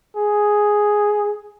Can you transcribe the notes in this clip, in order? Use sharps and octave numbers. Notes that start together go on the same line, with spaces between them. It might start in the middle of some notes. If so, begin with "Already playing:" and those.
G#4